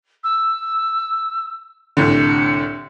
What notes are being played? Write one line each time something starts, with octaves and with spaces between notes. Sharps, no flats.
E6
C2 A2 D3 C#7